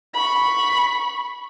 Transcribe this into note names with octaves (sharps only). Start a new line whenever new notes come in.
B5 C#6